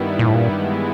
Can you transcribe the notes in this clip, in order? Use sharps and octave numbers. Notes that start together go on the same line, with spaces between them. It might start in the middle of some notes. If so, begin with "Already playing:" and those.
Already playing: G2 D#3 G3 B3 E4
A#2
A2
A#2
G2 E3 G#3 B3 E4